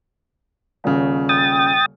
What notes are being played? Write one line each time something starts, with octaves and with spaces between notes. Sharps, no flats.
D#1 C#3
G5 D#6 A6